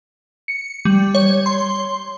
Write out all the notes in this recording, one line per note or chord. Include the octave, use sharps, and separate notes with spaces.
C#7
G3
C#5
C6